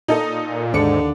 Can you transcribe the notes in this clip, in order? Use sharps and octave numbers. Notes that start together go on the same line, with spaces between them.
A#2 D#4 A4 D#5
D#2 G#2 D3 D4 C#7